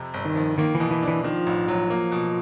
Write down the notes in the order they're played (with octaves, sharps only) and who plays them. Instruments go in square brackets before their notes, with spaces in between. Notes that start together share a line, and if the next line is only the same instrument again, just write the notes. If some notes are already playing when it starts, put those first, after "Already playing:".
Already playing: [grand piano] F2 C3
G1
[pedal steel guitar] D#3
[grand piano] F3
[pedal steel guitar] D#3 [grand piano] A#3
[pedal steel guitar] E3
[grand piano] B2
[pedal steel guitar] E3
[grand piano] D4
[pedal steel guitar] E3
[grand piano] D#3 [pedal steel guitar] F3
[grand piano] A1
F#3
A#3
B2